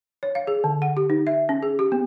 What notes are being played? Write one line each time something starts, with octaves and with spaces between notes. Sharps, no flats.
C#5
F5
G#4
D3
F#5
G4
D#4
E5
C#4
G#4
G4
B3